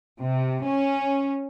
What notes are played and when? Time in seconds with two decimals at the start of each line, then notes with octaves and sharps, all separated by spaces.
0.20 C3
0.66 C#4